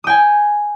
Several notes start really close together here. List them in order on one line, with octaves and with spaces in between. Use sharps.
D#6 G5 G#5